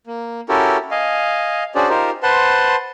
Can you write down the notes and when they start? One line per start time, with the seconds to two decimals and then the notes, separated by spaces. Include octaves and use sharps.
0.07 A#3
0.49 C#4 E4 F#4 G4 A4 A#4
0.91 D#5 F5 G#5
1.75 C#4 D4 F#4 G#4 C5 D5
1.90 D#4 F4 G4 A#4 C5
2.23 B4 C5 F#5 A5 C6